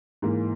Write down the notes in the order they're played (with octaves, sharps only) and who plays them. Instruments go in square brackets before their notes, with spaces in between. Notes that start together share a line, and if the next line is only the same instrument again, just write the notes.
[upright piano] G#2 E3 A#3